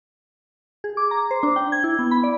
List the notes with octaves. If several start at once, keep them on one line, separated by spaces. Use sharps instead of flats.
G#4
D6
A#5
C5
D4
G5
G#6
E4
B3
B5
D5